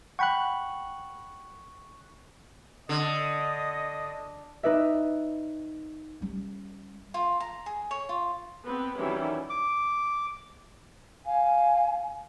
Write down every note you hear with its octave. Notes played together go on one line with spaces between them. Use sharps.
F#5 G5 B5 C#6 F#6
D3 D#5
D#4 B4 D5 E5
G3 C#4
F4
A#5
G#4
C#5
F4
B3 C4 B4
D#3 E3 F#3 G3 C#4 E4
D6
F5 G#5